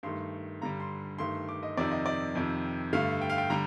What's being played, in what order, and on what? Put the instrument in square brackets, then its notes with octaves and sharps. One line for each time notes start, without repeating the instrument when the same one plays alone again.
[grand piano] G2 D#3 A3 C6
G2 D3 G3 A#5
C6
G2 D#3 A3 C6
D6
D#5
F2 C3 D#3 D5
D#5
D5
F2 C3 D#3
G2 D3 A3 F5
G5
F5
G5
D3 G3 A#5